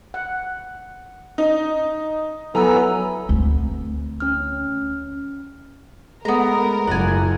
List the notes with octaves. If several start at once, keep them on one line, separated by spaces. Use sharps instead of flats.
F#5
D#4
F#3 B3 E4 A4 G#5 A#5 E6
D2 C4
C#4 F6
G#3 A3 B3 A#4 A#5
F#1 F4 D5 F#5 G#5